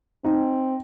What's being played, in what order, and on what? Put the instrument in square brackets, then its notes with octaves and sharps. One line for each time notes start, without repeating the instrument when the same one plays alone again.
[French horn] C4 [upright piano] D#4